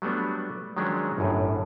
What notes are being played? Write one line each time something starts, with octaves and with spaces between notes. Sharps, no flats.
F#3 G3 A3 B3 D4
D#3 F3 F#3 G#3 C#4 D4
G1 F#2 A2